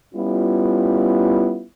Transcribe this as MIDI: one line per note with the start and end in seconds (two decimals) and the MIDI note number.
0.15 1.65 55
0.15 1.65 59
0.15 1.65 61
0.15 1.65 64
0.15 1.65 65